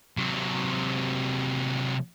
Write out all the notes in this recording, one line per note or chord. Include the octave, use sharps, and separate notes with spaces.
C3 F#3